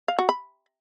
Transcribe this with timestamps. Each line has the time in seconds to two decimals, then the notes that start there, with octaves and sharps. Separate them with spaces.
0.08 F5
0.19 F#4
0.29 B5